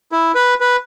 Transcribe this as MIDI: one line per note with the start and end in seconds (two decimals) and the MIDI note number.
0.12 0.32 64
0.35 0.54 71
0.60 0.76 71